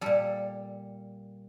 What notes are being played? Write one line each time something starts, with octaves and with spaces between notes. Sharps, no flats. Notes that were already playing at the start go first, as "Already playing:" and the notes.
A#2 G3 A4